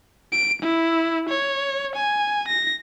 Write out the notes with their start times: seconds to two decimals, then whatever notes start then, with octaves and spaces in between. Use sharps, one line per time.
0.32 D7
0.62 E4
1.29 C#5
1.95 G#5
2.48 A#6